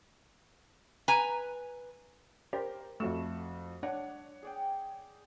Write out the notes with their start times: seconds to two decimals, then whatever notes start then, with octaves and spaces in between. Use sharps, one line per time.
1.08 B4 G#5 A#5
2.53 G4 A#4 C5
3.00 F2 A3 F#4 C#6 E7
3.83 D4 C#5 D5 F#5
4.42 G#4 D5 G5